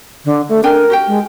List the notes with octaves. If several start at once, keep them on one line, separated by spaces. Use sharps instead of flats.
D3
A3
D4 A#4 G5 G#5
F#4 G4 G5
G#3